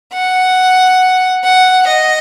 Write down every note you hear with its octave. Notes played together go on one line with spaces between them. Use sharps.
F#5
F#5
D#5